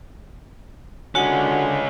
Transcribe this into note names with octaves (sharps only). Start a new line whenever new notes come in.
D3 G#3 C#4 F#4 F#5